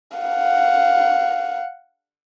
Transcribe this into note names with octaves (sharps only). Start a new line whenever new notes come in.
F5 F#5